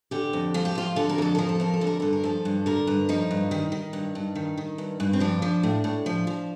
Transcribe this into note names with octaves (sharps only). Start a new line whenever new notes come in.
D3 G4
F2
F3 F4
G4
F2 F4
D3 A4
A#4
F2 A4
F3 A#4
A4
F2 A#4
A4
D3
A#4
G2 A4
A#4
F3 A4
G2
D3 A#4
G2
F3 D#4
G2
D#3
D#3
G2
G2
D#3
D#3
G2
G2
C4
F3 D4
F3
A2
A2
F3
F3